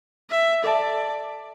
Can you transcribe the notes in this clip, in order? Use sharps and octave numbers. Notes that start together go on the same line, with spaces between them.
E5
A4 D5 E5 A5